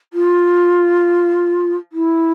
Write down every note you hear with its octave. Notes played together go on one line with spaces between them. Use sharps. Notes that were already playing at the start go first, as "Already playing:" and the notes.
F4
E4